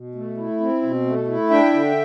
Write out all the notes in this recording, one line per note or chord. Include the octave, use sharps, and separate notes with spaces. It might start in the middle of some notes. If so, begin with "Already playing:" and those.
Already playing: B2
A3
E4
C4
B2
A3
E4
D4 E5 G5
D3